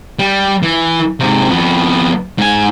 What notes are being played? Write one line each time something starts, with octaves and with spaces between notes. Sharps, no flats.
G3
E3
G#2 C3
F2 B3
G#2 G#5